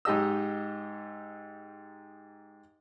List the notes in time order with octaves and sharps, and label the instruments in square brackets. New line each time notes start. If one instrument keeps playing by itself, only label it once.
[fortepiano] G#2 D#4 G4 D#5 E6